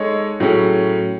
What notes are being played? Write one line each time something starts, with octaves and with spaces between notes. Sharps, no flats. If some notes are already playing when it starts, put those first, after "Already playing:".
Already playing: G#3 D#4 A4 C#5
A2 F#3 C#4 G#4